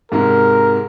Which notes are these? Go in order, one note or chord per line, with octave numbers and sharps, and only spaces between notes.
G#2 C3 G#3 A#4